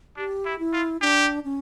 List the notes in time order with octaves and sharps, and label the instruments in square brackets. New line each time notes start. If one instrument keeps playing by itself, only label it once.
[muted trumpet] D4 [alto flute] G4
[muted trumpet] E4
[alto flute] E4
[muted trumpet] F4
[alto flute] D4 [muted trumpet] G4
[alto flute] C#4